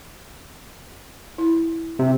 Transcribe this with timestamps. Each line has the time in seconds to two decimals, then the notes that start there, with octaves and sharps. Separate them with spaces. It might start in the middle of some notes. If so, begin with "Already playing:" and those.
1.38 E4
1.99 C3